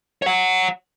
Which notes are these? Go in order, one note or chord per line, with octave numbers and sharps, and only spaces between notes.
C#5 F#5